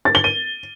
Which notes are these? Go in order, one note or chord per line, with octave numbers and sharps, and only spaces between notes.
A6
G7
D#7